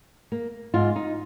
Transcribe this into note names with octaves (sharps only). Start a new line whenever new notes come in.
A#3
G#2 F4
D#4